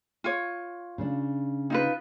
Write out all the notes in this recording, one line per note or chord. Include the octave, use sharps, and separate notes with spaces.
F4 C#5
C#3 D4
D#4 F4 B4